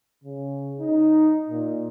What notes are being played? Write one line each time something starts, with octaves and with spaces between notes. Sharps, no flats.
C#3
D#4
A#2